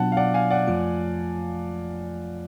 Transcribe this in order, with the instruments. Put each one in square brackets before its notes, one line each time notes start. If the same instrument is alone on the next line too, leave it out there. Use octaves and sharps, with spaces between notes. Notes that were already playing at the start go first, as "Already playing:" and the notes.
Already playing: [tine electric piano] B2 F#3 B3 D4 F4 [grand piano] F#5 A5
[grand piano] F5
D5 F#5
F5 G#5
D5 F#5
[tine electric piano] F2 F3 A3 F4